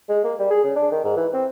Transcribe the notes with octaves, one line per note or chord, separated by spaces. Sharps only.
G#3
A#3
G3
G#4
C#3
D4
D#3
G#2
E3
C4